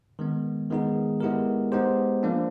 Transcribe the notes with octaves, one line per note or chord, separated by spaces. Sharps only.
D#3 G#3 B3
D#3 G#3 B3 D#4 G#4
G#3 B3 E4 G4 A#4
G#3 B3 D#4 G4 C5
F3 A#3 D4